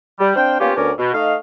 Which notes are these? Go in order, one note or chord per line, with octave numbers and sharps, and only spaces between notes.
G3
C4 D4 C5 F5 G5
A#3 B3 C#4 F4 G4
D2 B3 C#4 A#4 D5
B2
A3 D#4 D#5 F5